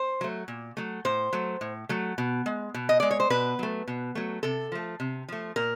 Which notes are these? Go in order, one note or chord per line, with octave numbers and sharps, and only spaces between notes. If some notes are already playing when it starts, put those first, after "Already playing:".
Already playing: C5
F#3 A3
A#2
F#3 A3
A2 C5
F#3 A3
A2
F#3 A3
B2
G#3
B2
D#5
G#3 D5
C#5
C5
B2 B4
F#3 A3
B2
F#3 A3
C3 A4
F3 A3
C3
F3 A3
A#2 A#4